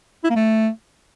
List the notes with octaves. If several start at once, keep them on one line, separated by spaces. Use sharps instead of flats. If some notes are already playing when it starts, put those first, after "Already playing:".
E4
A#3
A3